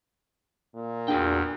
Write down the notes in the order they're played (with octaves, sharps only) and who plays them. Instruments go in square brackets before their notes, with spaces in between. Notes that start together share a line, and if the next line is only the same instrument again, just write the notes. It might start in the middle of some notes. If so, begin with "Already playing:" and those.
[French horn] A#2
[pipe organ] E2 [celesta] D4 [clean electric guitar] F#4 G#4 G5